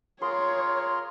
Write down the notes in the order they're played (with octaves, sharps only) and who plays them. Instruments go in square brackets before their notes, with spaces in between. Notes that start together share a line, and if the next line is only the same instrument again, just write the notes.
[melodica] F4 G#4 A#4 [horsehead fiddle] C#5 [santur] C6